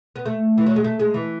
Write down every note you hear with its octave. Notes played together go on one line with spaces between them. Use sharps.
B3
A3
E3
F#3
G#3
A3
G#3
E3